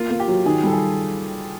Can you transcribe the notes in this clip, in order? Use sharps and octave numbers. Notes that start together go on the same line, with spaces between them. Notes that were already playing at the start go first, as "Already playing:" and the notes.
Already playing: A#3 F4
A#3
G4
F#3
D#3 G#4
G3 A4
G#4